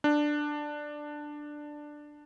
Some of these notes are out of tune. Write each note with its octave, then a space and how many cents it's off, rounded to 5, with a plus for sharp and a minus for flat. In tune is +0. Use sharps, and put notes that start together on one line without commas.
D4 +10